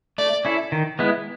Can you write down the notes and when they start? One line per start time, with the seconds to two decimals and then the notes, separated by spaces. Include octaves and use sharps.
0.18 A3 D5
0.45 C#4 E4 A4
0.72 D#3
0.99 G#3 B3 E4